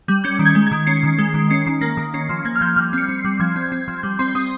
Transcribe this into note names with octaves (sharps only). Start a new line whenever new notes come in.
G3
C#4 G6
D#3
G#6
G#3
D#3 G#6
C#4 C7
D#3
G#3
D#3
C#4 C7
D#3
A#3 A#6
D#3
C#4 C7
F3
A#3 G#6
F6
F3 G6
G3 F6
C4 C#7
C4
C7
G3
F3 G#6
C4
C4
F3
G3 G6
C4 C6
C4 D#6